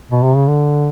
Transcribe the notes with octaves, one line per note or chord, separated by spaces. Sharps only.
B2
C3
C#3
D3